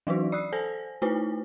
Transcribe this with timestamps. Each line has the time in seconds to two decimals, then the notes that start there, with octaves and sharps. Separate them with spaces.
0.07 E3 F#3 D4 D#4 F#4
0.32 D5 D#6 E6 F#6 C7
0.53 A4 C5 G#5 A#6
1.02 A3 D#4 E4 B4 C5 G#5